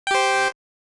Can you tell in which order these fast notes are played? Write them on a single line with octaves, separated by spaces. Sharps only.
G5 G4 C5